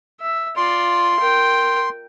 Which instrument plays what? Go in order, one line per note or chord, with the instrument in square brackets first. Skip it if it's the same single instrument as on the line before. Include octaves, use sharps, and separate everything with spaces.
[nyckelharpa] E5
[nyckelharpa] F4 D5 [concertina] C6
[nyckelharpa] A#4 G5